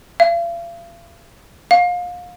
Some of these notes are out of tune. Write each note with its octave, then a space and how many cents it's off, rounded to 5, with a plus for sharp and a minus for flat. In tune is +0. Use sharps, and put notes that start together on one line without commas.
F5 -40
F5 +30